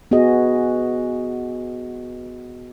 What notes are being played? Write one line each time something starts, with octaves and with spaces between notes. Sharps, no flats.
B3 F#4 G#4 D#5